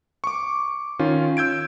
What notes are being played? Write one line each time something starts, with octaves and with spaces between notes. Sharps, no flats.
C#6 D6
D#3 C#4 F4
E6 G6 G#6 D7